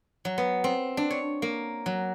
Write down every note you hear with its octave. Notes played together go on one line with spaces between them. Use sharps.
F#3
B3
C4
D4
C#5
A#3
F#3